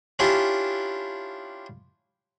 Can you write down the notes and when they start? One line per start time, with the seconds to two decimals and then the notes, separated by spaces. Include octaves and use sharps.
0.19 C#4 D4 E4 F4 G4